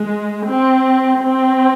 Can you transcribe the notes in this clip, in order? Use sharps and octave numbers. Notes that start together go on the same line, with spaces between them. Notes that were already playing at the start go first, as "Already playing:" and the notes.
Already playing: G#3
C4
C4